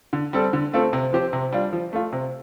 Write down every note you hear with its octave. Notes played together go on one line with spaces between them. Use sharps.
D3
G3 C4 A4
D3
A3 C4 F4 A4
C3
F3 C4 G4 C5
C3
G3 D4 F4
F3
A3 F4
C3